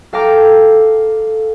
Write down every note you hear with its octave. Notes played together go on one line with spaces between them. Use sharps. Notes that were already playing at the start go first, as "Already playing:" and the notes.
A4 F5 G5 A#5 D6